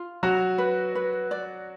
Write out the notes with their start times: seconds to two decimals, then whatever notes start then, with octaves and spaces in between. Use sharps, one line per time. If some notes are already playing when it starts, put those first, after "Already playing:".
Already playing: F4
0.23 F#3 F#4 A#5
0.58 B4
0.95 B4
1.31 D5